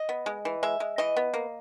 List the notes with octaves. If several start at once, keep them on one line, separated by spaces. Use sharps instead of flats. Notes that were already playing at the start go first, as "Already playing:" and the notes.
Already playing: D#5
B3
G#3
E3
G#3 E5
G#3
E3 D#5
B3
A#3